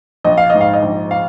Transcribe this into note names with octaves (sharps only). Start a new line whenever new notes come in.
A#1 D#5
F5
G#2 D#5
F5
D#5
A#1
F5